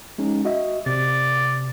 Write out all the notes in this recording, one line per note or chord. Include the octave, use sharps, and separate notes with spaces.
G#3 C#4 D#4
F#4 D#5 E5
C3 D5 A6